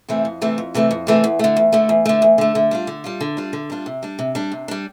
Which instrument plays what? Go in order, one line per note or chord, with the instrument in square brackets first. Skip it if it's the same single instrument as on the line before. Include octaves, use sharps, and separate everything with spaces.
[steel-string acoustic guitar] C3 E3 A3 C4
F2
C3 E3 A3 C4
F2
C3 E3 A3 C4
F2
C3 E3 A3 C4
E2
D3 A3
E2
D3 A3
E2
D3 A3
E2
D3 A3
D3
G3 D4 F4
D3
G3 D4 F4
D3
G3 D4 F4
D3
G3 D4 F4
C3
G3 D4
C3
G3 D4
C3
G3 D4